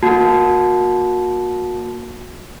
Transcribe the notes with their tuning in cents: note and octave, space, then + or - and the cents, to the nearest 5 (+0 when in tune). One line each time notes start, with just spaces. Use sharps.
A#3 +10 F#4 -30 A5 -15